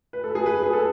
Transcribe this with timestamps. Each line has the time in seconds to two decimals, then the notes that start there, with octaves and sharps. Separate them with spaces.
0.13 B4
0.24 A4
0.35 G#4
0.46 B4
0.63 G#4
0.73 A4